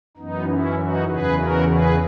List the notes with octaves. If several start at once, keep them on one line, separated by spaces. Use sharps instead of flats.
F#2 E3 B3 D#4
C#4 E4
D#4 F#4
E2 C#3 E3 G#4 B4
F#4 A#4
G#4 B4